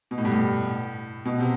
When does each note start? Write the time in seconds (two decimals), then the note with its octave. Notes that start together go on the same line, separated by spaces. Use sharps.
0.11 B2
0.18 A2
0.25 G2
0.32 A2
1.25 B2
1.39 C3